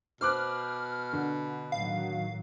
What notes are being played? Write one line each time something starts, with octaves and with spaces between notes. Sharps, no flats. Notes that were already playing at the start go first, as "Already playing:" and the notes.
B2 C5 D6 F6 F#6
D3
A2 D#3 F#3 F5